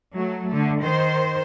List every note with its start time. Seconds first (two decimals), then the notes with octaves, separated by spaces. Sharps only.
0.14 F#3 A3
0.49 D3 A3
0.81 D#3 C5